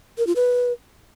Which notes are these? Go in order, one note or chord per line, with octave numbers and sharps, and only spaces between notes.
A#4
F4
B4